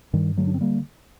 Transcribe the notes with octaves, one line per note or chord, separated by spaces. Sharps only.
G2 D#3 G3
D3 F#3 A3
D4
C4
G3 A#3